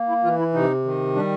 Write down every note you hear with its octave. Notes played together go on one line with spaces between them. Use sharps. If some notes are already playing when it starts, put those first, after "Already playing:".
Already playing: A#3
E4
E3 F4
E4
C3 D#4
D#3
G3 D4